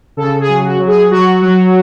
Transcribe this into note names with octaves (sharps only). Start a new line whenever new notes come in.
C#3 A4
G#4
F#3
F#4
F#3
G#4
F#3 F#4
F#3